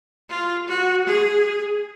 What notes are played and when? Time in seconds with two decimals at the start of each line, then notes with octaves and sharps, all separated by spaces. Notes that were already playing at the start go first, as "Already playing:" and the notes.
0.29 F4
0.68 F#4
1.06 G#4